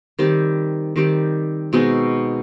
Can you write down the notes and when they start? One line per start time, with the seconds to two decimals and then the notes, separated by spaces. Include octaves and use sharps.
0.19 D#3 G3 C4 G4
0.96 D#3 G3 C4 G4
1.73 B2 G#3 C4 D#4